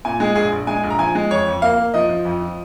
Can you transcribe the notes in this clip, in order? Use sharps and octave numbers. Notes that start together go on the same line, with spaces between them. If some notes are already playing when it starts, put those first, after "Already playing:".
A#2 G#5
G#3 G#4
A#1 G#4
A#1
G#3 G#5
A#1
A#5
F3 G#5
G#3
F2 C#5
F2
A#3 F5
A#3
F3 D#5
F3
F2
F3